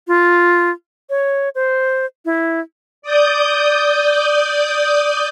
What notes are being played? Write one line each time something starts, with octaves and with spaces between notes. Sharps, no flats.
F4
C#5
C5
E4
D5 D#6 G6